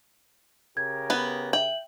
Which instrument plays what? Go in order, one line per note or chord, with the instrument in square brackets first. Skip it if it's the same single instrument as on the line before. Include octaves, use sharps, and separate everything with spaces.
[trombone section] C#3 G4 A#4 [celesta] G#6
[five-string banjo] B3 B4
[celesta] E5 F#7 [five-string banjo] G5